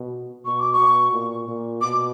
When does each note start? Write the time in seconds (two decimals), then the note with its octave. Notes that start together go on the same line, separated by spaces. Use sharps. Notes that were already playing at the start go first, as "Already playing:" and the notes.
Already playing: B2
0.45 B2 C#6
0.59 D6
0.73 C#6
0.79 B2
1.13 A#2
1.48 A#2
1.81 B2 D6